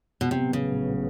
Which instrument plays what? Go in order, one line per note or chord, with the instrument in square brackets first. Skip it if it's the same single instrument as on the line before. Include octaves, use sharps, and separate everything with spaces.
[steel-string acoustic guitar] B2
[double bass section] A#1 A2 F#3 B3 [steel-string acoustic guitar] C3
[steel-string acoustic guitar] C#3